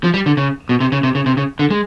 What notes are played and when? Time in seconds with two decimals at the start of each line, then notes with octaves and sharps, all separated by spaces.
0.04 F3
0.14 G3
0.26 D3
0.37 C#3
0.69 B2
0.80 C3
0.92 C#3
1.03 C3
1.15 C#3
1.26 C3
1.37 C#3
1.59 D3
1.70 G#3